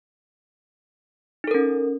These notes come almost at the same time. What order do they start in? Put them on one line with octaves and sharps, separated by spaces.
D#4 A4 A#4 C#4